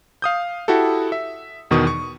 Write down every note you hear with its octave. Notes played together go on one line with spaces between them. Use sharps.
F5 D#6 G6
E4 F#4 G4 A4
E5
E2 B2 D#3 C#6 D#6
C#6